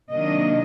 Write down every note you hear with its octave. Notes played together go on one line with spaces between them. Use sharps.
C3 D#3 F#3 A#3 D4 D#5